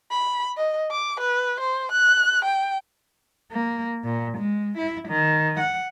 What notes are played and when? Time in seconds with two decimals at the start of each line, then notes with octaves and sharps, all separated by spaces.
0.11 B5
0.57 D#5
0.91 D6
1.20 B4
1.60 C5
1.92 F#6
2.45 G5
3.52 A#3
4.05 A#2
4.38 G#3
4.78 E4
5.09 D#3
5.60 F#5